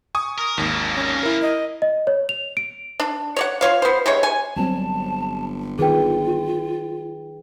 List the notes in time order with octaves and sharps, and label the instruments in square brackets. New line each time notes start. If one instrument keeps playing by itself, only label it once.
[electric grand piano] G#5 C#6 D#6
[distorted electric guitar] A#4
[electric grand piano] G#1 D#2 [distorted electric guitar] F3 A#3
[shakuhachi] C#4
[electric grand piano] E4 A#4
[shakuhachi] D#5
[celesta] D#5
C#5
F7
D7
[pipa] D4
C#5 D5 F#5
F4 C#5 F5
B3 C5
C3 G#3 C#5
G#5
[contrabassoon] G1 [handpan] F#3 G3 C4 [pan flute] A5
[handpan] D#3 [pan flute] F4 [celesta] G#4 B4 G5